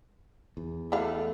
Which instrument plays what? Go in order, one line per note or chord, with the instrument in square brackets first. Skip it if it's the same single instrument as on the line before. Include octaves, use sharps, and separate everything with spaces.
[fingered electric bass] E2
[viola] A3 [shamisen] E4 F#4 F5